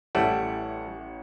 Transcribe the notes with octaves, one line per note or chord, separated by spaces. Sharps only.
A1 G3 A3 E4 C#5 F#5